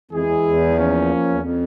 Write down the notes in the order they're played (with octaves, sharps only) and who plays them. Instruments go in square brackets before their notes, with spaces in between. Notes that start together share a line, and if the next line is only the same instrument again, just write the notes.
[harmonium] F2 [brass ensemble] E3 G#3 E4 G#4
[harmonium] E2
E2
[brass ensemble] F3 A#3 C#4
[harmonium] E2
F2